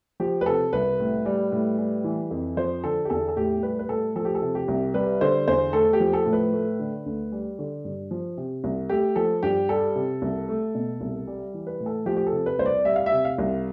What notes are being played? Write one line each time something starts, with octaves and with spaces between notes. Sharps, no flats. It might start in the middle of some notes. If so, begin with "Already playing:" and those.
F3 G4
B4
C3 A4
C2 B4
A2
G3
A2
G3
E3
F2
F3 C5
D3 A4
G4
E2 A4
A4
A2 G4
G3 B4
B4
A2 A4
F3 A4
G4
A4
C3
G4
C2
G3 B4
D3 C5
E2 C5
A3 A4
G4
F3
A4
A2
B4
A3
D3
D2
G3
D3
G2
F3
C3
C2
A3 G4
F3 A4
G2 G4
G3 A4
C3
C2
A3
B2
C2
G3
E3
B4
A2
A4
F3 G4
G4
A4
C3
B4
C2 C5
D5
G3 E5
F5
E5
C3
F5
C2